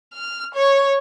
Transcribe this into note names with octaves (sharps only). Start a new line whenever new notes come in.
F6
C#5